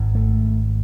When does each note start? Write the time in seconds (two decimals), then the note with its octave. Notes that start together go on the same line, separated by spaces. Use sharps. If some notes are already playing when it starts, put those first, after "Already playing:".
Already playing: G#1 G#2
0.15 A3